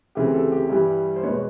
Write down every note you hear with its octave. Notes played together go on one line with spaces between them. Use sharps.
D2 C#3 E3 A3 C4 G4
G4 A4
G4
G2 E3 G3
C5
E2 B2 G#3 B3 B4 C#5